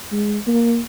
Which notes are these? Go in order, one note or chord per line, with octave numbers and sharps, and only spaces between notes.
G#3
A#3